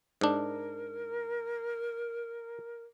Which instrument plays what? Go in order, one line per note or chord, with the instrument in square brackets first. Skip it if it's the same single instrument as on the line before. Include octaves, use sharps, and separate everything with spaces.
[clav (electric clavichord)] G#2 D4 [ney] A#4